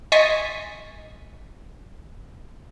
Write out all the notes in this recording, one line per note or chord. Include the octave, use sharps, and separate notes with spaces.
D#5 G#5 C6 C#6 A6 B6